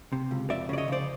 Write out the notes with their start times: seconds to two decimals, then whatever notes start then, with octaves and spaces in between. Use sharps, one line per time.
0.12 C3
0.31 C#2
0.50 F2 D5 E5
0.69 C#3 D5
0.78 C#5 D#5
0.88 C#3 C5 D5